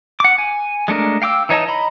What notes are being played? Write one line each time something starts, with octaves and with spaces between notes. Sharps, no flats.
F#5 D6
G#5
G#3 A3 D4 A#4
F5 G5 D6 E6
E3 D#4 C#5 D#5 A5
D#5 A#5 B5